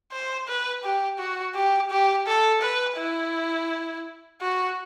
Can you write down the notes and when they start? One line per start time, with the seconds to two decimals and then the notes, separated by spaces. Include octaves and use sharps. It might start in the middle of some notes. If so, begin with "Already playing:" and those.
0.12 C5
0.48 B4
0.83 G4
1.18 F#4
1.55 G4
1.90 G4
2.27 A4
2.62 B4
2.97 E4
4.41 F#4